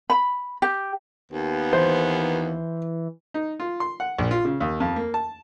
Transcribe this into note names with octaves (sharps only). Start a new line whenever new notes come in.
B5
G4
D#2 B3
E3 C5
D#4
F4
C6
F#5
A#1
F4
C#3
D#2
F2
A#3
A5